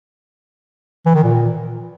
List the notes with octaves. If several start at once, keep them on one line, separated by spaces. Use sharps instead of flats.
E3
D#3
A#2